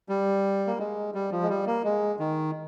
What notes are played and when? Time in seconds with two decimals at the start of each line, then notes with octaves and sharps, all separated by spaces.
0.09 G3
0.67 A#3
0.79 G#3
1.14 G3
1.32 F3
1.43 G#3
1.49 G3
1.67 A#3
1.84 G#3
2.19 D#3